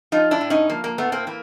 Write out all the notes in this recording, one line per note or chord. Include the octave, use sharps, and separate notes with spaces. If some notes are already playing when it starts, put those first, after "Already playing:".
F3 D#4 F4
D4 E4
A2
C#4 D#4
F3 A#3
A#3
A2 A3 B3
A#3 C4
E3 A#3